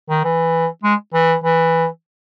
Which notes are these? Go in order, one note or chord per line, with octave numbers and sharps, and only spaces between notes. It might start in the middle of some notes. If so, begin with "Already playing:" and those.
D#3
E3
G#3
E3
E3